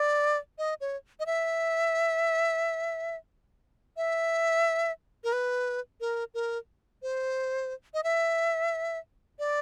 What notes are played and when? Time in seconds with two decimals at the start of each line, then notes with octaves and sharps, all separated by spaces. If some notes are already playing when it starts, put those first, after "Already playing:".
Already playing: D5
0.58 D#5
0.81 C#5
1.20 D#5
1.26 E5
3.97 E5
5.24 A#4
5.33 B4
6.01 A#4
6.34 A#4
7.03 C5
7.94 D#5
8.04 E5
9.39 D5